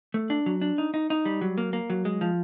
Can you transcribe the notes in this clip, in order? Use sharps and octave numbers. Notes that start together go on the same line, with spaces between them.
A3
D4
F#3
D4
D#4
D#4
D#4
G3
F#3
A#3
A#3
F#3
G#3
F3